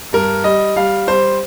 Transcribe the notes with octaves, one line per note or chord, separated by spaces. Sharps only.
G2 A#4
G3 D#5
G3 F5
G3 C5